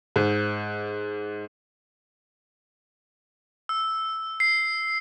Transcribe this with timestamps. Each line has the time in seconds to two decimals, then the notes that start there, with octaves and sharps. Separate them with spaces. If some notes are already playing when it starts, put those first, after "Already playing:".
0.16 G#2
3.69 E6
4.40 C7